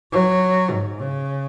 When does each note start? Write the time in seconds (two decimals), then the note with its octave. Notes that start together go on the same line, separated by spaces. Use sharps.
0.12 F#3
0.70 G#2
1.01 C#3